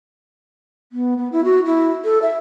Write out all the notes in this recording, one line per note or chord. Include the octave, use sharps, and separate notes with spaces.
B3
B3
E4
F#4
E4
A4
E5